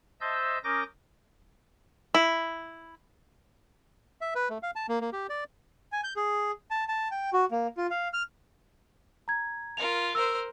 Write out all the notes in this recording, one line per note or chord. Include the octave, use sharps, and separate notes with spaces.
C5 D#5 E5 A5 E6 G6
C#4 A#4 D6 D#6 G6 A#6
E4
E5
B4
A3
F5
A5
A#3
A#3
G4
D5
G#5
G6
G#4
A5
A5
G5
F#4
A#3
F4
F5
F6
A#5 G#6
F4 A#4 F7
A#4 C5 E6